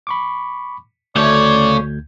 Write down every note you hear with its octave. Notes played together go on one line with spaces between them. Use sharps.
B5 C#6 D6
D2 C#3 A3 C#5 D5 G6 G#6